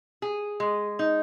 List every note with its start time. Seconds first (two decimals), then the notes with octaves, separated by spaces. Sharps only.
0.22 G#4
0.60 G#3
0.99 D#4